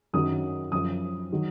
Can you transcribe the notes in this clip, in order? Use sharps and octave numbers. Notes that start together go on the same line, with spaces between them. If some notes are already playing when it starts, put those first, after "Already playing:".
F#2 D#3 F#3 D#6
F#2 F3 D#6
D#3 F#3